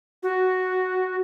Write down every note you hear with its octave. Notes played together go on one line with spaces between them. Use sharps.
F#4